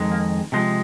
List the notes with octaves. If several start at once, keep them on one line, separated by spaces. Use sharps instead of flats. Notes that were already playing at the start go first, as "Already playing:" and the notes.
Already playing: F2 D#3 G#3
A#3
C3 F3 G#3